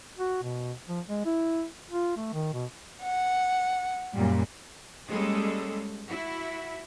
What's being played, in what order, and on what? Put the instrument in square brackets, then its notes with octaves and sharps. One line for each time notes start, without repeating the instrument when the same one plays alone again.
[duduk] F#4
B2
F3
G#3
E4
F4
A3
D#3
B2
[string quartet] F#5
[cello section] F#2 A#2 G3
G3 G#3 A#3 C#4 G#4 A4
E4 F#4